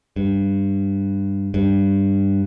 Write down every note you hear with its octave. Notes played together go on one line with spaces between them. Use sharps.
G2
G2